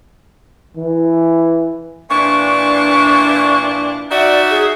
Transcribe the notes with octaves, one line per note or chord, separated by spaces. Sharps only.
E3
A#2 E3 D4 C#6
D#4 F#4 D5 E5
G#4